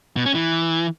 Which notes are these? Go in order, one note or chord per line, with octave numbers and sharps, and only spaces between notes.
B2
C#4
E3